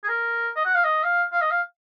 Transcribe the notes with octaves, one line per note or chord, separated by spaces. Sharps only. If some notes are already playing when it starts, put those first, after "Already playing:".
G#4
A#4
D#5
F#5
F5
D#5
F5
F5
D#5
F5